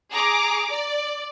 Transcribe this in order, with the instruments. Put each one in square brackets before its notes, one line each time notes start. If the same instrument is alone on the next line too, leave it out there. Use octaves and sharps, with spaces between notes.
[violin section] G#4 A#5 D6
D5